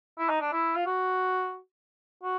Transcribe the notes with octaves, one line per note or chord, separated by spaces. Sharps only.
E4
D#4
D4
E4
F4
F#4
F#4